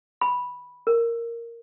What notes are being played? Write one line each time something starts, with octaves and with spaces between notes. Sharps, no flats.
B5
A#4